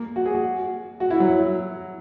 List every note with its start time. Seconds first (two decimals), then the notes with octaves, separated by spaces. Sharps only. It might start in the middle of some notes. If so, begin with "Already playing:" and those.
Already playing: A#3
0.16 F#4
0.25 G#4
0.35 F#4
1.00 F#4
1.10 E4
1.20 F#3